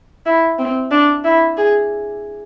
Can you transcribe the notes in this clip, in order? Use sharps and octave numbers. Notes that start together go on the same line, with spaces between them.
E4
C4
D4
E4
G#4